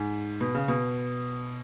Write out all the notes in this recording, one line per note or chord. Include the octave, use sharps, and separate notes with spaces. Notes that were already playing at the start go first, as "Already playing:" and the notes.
Already playing: G#2
B2
C#3
B2